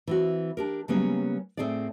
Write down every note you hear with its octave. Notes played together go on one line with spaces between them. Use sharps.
E3 C4 F#4
D4 G4 A#4
C#3 F#3 G3 A#3 B3 C#4
A2 A3 C4 G#4 A4 D5